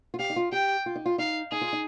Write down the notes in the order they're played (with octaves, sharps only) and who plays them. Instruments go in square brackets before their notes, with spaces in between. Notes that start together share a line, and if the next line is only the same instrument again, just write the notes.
[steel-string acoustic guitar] F4
[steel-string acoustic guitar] G4 [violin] F5
[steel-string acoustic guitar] D#4
F4
[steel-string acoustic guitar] G4 [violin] G5
[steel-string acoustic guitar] F4
D#4
F4
[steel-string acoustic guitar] D#4 [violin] F5
[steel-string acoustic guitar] D#4 [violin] G#4
[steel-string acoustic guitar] F4
D#4